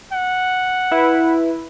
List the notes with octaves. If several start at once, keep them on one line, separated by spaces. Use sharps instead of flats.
F#5
E4 B4